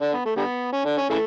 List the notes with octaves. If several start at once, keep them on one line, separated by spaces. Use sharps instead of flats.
D3 D4
B3
A3
D3 G3 B3
C#4
D3 D4
C#4
C#3 E3 A3